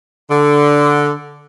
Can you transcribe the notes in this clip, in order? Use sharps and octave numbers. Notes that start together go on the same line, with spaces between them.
D3